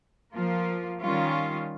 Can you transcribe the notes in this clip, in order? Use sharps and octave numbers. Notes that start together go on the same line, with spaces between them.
F3 A#3 F4
D#3 G3 C#4 F4